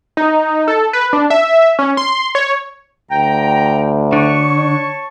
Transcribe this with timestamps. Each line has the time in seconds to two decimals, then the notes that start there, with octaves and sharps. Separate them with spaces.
0.17 D#4
0.68 A4
0.93 B4
1.13 D4
1.30 E5
1.79 C#4
1.97 C6
2.35 C#5
3.11 D2 G5 A#5
4.13 D3 C#5 A5 C#6